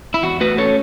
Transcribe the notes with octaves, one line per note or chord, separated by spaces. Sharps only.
E4
E2 F#4
A3 F#4 B4
C#4 A4 C#5